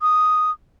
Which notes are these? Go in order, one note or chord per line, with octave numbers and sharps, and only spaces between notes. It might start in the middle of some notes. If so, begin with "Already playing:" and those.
D#6